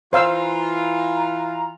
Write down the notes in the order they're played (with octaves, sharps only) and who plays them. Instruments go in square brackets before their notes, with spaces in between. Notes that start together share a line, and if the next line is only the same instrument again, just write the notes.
[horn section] E3 F4 [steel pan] C5 F5 E6 [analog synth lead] A#5